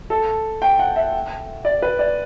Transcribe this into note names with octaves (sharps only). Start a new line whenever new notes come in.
A4
G5
F#5
E5
D5
B4
D5